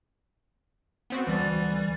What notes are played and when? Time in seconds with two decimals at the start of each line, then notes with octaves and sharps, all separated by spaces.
1.10 B3 C4 F#4
1.27 D2 E3 G3 A6